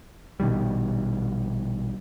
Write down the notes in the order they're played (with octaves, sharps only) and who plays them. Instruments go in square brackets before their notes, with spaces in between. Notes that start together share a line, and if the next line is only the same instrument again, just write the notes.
[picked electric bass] A#1 B2 D#3 G3